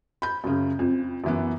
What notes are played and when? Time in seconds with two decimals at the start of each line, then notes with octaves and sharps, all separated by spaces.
0.22 B5 G6
0.44 F#2 C#3
0.79 F2
1.24 F#2 E3 B3